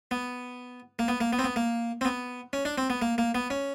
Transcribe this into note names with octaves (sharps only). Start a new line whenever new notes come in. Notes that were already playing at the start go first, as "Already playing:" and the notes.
B3
A#3
B3
A#3
B3
C4
B3
A#3
C4
B3
C#4
D4
C4
B3
A#3
A#3
B3
C#4